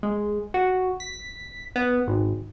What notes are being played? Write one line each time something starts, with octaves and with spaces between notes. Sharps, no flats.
G#3
F#4
B6
B3
G#1